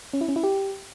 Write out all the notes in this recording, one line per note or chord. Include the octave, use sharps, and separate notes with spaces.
C#4
E4
C#4
E4
G4